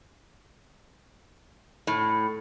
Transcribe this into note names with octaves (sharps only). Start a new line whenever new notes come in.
A2